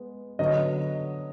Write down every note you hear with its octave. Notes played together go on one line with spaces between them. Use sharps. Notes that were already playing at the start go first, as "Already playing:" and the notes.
Already playing: G#3 B3
D3 F#3 B3 D#5